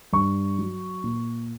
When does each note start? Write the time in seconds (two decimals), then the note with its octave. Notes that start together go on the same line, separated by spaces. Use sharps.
0.13 G2 C#6
0.58 F#3
1.04 A#2